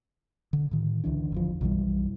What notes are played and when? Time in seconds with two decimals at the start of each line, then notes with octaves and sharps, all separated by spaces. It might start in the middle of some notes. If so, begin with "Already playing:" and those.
0.53 D3
0.71 A2 D#3
1.04 C#2 D3 E3 D4
1.32 G1 E2 F3
1.61 B1 F#2 E3 G3